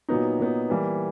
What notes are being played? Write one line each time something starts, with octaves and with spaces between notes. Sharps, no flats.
A#2 F#3 B3 D#4
A#2 F#3 B3 D#4
E3 G3 A#3